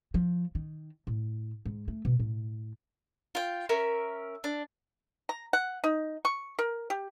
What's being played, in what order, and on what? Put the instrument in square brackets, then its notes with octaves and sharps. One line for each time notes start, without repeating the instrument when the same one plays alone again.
[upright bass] F3
D#3
A2
G#2
A3
B2
A2
[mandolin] F4 G5
C#4 A#4 E5
D4
[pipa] A#5
F#5
D#4
C#6
A#4
G4